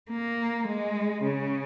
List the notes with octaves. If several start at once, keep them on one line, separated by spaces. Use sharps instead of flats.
A#3
G#3
C#3